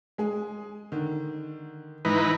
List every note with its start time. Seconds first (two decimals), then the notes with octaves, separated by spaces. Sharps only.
0.18 G#3 G#4
0.92 D3 D#3
2.05 G#2 E3 D#4 B4